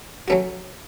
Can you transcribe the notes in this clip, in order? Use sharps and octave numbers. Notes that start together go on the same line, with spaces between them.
F#3 A3 C#4 F#4